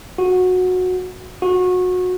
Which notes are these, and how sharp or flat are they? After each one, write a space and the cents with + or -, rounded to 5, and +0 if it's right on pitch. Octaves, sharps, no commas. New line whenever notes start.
F#4 -15
F#4 -25